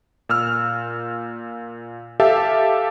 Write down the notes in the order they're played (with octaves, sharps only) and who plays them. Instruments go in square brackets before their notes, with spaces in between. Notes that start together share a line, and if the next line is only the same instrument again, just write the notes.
[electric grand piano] A#2 E6 F6
G4 A4 E5 F5 A5